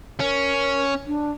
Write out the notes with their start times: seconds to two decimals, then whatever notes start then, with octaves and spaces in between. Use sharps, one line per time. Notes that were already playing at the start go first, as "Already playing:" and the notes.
0.20 C#4 A#4
1.06 D4